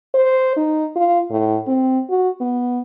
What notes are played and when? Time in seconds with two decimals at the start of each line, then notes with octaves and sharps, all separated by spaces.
0.14 C5
0.56 D#4
0.96 F4
1.30 A2
1.67 C4
2.09 F#4
2.41 B3